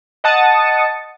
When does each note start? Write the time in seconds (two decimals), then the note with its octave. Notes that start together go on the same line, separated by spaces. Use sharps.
0.24 D#5 F#5 A5 D#6 A6 C#7